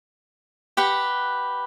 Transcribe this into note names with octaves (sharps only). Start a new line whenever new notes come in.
G4 B4 F#5